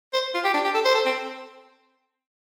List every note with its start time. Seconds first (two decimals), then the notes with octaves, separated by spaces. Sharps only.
0.14 C5
0.35 F4
0.45 G4
0.54 D4
0.65 G4
0.75 A4
0.85 C5
0.95 A4
1.06 C4